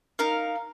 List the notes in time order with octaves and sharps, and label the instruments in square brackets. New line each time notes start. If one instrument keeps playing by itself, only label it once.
[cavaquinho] D#4 A#4 F5